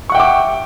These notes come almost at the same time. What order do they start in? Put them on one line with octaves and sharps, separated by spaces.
C#6 F#5 G5 E5 D6